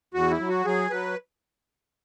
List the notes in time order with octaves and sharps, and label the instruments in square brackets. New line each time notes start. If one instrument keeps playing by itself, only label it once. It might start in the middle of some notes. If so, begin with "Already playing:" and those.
[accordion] E2 F#4
E4
F#3
F#4
F#3 G#4
F#3 B4